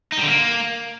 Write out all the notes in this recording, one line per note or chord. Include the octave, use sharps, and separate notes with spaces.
D#4
G3
D3
A#3